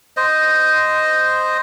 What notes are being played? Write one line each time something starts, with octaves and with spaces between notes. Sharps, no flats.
C5 D#5